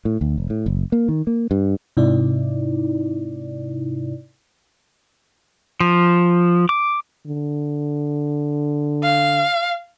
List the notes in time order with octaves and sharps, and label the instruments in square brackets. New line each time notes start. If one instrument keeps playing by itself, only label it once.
[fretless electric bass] A2
D2
F1
A2
F#1
A#3
D#3
A#3
G2
[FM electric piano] G#2 C3 D#4 E4 D5
[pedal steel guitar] F3
D6
[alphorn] D3
[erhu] F5